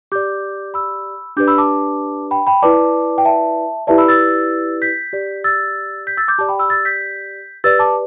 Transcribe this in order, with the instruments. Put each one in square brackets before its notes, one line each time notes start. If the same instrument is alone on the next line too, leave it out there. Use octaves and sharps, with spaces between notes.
[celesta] G4 D5 D6 G6
B5 E6
D4 G4 B4 D5 D6 G6
B5 E6
A5 D6
G5 B5
G5 B5
E4 B4 D5 A5 D6
G5
E5 A5
E4 G4 B4 D5 E5 A5
B5 E6
E6 A6
G6 B6
G4 D5
E6 A6
G6 B6
E6 A6
D6 G6
G4 D5 A5 D6
G5 B5
B5 E6
E6 A6
G6 B6
G4 B4 D5 E6 A6
A5 D6